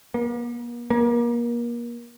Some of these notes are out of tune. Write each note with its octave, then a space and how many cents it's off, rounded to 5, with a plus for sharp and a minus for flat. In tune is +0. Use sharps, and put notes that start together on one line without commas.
A#3 +45
A#3 +30